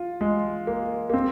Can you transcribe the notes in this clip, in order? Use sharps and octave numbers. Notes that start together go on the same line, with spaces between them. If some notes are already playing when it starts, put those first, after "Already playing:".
Already playing: F4
G#3
A#3
A#3
C4